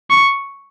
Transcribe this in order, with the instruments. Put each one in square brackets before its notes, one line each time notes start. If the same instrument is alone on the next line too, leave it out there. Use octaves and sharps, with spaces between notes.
[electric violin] C#6